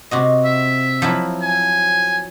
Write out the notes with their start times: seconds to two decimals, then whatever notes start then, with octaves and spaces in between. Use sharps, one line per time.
0.11 C3 F#4 D#5
0.45 E5
1.02 F3 F#3 E4
1.43 G#5